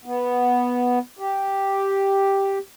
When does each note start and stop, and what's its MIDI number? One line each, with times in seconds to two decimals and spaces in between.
0.05 0.99 59
1.19 2.58 67